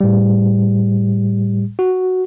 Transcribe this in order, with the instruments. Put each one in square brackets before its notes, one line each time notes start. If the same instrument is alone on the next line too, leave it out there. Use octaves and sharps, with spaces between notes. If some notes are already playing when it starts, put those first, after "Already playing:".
[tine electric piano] A2 G3
F#4